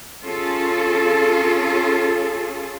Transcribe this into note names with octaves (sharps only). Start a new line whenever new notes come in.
C#4 F4 G#4 A4